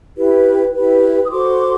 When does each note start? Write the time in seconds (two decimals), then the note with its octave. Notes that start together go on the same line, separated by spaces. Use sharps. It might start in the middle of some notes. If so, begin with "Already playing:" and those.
0.18 E4 G4 B4
0.75 E4 G4 B4
1.24 D#6
1.31 F#4 A4 C5 C6 D6